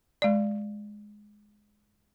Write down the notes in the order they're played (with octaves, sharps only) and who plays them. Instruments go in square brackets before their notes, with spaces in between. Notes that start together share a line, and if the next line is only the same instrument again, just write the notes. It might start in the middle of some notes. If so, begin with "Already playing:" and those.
[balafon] G#3 D5